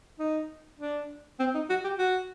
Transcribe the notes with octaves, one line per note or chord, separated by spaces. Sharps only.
D#4
D4
C4
D#4
F#4
G4
F#4